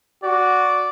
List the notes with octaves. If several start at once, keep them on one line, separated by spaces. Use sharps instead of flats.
F#4 D5